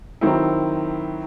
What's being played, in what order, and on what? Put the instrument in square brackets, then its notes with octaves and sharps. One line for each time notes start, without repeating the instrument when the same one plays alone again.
[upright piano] D#3 F#3 C4 E4